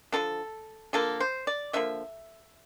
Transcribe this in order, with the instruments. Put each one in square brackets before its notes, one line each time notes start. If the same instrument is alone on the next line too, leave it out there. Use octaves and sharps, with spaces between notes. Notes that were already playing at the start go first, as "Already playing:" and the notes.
[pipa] D3 F3 A#3 A4
D3 F3 A#3 A4
C5
D5
D3 F3 A#3 E5